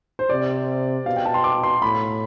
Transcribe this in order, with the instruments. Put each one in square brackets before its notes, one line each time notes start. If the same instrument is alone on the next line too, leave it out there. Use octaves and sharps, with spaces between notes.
[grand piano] C5
[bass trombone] C3 [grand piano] D5
[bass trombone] B2 [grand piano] F5
[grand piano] G5
A5
C6
D6
C6
[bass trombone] A2 [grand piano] B5